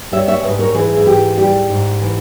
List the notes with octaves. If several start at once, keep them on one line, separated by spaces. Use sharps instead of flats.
G3 C#5 E5
C#5 E5
G#2 B4 D#5
A#4 C#5
E3 G#4 B4
E4
G#2 G4
G3 G4
G#2
E3